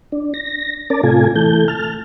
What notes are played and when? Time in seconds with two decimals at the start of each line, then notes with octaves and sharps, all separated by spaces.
0.12 D4
0.34 A#6
0.90 C#4 A#4 D5 A5
1.03 A2 C3 F4 A4 G#5
1.35 E3 A3 A4 G6
1.68 A5 F6